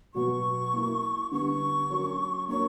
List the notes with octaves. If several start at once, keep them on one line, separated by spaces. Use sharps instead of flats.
B2 F#3 B3 F#4 C#6
A#3 E4 A#4
D3 G3 B3 D4 C#6
F#3 C#4 F#4 A#4 C#5
A#3 D4 F#4 A#4 C#5 C#6